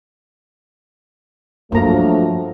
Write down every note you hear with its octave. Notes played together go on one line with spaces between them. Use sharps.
G2 F3 F#3 A3 A#3 D4 A#5